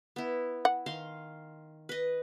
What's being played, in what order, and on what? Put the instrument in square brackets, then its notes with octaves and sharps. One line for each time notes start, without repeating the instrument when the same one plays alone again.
[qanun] B3 E4
[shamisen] F#5
[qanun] D#3 F5 C6
B4 D#5